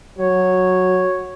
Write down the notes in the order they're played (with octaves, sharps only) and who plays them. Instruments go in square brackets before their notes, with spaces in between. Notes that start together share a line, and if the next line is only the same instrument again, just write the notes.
[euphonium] F#3 [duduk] C#5